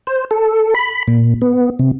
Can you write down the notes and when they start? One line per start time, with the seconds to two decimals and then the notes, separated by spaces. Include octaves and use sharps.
0.07 C5
0.31 A4
0.75 B5
1.08 A#2
1.42 B3
1.79 C3